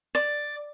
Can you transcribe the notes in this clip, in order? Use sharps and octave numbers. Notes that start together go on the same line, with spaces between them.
D5